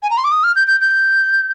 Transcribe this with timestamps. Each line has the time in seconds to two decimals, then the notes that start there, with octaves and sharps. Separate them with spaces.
0.03 G#5
0.10 A#5
0.18 C6
0.24 D6
0.32 D#6
0.44 F6
0.56 G6
0.68 G6
0.81 G6